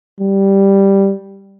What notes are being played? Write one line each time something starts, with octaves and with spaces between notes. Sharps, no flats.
G3